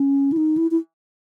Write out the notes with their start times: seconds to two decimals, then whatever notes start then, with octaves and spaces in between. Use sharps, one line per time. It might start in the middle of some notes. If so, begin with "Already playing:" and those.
Already playing: C#4
0.32 E4
0.37 D#4
0.57 E4
0.71 E4